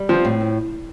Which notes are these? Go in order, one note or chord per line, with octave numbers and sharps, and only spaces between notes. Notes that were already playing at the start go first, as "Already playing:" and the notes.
Already playing: G3
F3 C4
A2
C4